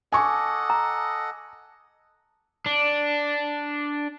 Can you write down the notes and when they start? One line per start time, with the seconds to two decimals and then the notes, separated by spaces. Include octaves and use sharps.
0.12 A4 D#5 F#5 G#5 A5 C#6 D6
0.70 A#5
2.66 D4